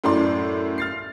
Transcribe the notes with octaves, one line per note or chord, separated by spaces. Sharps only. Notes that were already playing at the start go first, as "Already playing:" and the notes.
F#2 A2 E4 D5 C6
F6 A6 C7